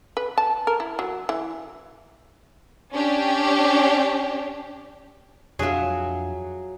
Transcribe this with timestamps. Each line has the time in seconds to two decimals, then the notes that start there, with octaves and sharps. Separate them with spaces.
0.17 B4
0.38 A5
0.67 A#4
0.80 E4
0.99 F#3
1.29 E3
2.93 C#4 D4 G4
5.59 F2 F#3 D4 F4 G#4 E5